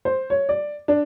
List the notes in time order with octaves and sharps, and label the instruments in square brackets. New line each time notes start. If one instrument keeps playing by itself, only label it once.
[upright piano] C5
C#5
D5
D4